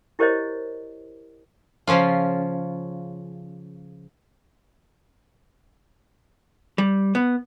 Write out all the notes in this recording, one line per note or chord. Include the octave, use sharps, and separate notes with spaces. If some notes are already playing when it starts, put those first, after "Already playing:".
E4 G4 A#4 C5 C#5 D#5
C#3 F3 C#4 F4
G3
B3